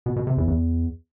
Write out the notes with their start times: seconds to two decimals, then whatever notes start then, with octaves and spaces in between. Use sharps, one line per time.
0.06 B2
0.16 B2
0.27 C3
0.37 E2
0.48 E2